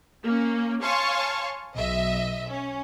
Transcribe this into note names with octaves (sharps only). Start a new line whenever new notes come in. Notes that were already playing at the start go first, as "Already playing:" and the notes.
A#3 C#4
C#5 F5 G#5 A5 C6 C#6
B1 D#5 E5
C#4